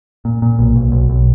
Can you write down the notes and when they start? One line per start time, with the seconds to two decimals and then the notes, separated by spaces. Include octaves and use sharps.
0.25 A#2
0.42 A#2
0.59 B1
0.76 B1
0.92 B1
1.10 B1